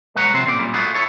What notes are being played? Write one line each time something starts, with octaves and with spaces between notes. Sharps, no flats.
B2 G#3 B4 C#5 F#5 A#5
C3 F3 C4 C5
A#2 C#3 C4 C#5 D5
F#2 A#2 G3
A3 F4 F#4 G#4
E4 A4 C#5